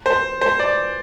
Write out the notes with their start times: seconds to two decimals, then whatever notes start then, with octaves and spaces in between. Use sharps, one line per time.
0.06 C5
0.41 C5
0.59 D5